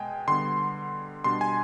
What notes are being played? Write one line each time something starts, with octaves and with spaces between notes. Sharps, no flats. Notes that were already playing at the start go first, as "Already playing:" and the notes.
Already playing: B2 G#3 G5 G#5
D3 G3 B3 C6
B2 G3 D4 C6
G#5